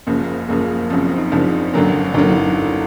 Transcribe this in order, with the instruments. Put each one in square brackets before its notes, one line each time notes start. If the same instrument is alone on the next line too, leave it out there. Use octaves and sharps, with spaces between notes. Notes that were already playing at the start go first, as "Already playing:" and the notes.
[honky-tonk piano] F#1 F#2 C#3 F3 [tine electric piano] A#3
[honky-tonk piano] F#1 F#2 C#3 F3 [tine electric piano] A#3
[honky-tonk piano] F#1 F#2 C#3 F3 [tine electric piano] C4
[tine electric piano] C#4
D#4
[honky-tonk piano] F#1 F#2 C#3 F3 [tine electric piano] D4
[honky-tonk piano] G1 G2 D3 F#3 A#3 [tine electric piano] C#4
[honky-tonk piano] G1 G2 D3 F#3 A#3 [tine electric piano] D#4
[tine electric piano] E4